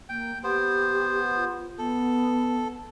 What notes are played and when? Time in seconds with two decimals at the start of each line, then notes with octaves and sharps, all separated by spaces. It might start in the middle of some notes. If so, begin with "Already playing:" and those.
0.09 A#3 G5
0.44 B3 G4 C5
1.36 F4
1.78 B3 A4